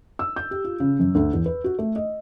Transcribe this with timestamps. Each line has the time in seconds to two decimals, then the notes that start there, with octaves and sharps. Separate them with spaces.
0.19 E6
0.36 G6
0.51 G4
0.64 F4
0.80 C#3
0.99 F#2
1.15 D2
1.33 E2
1.46 B4
1.64 F#4
1.79 A3
1.96 D#5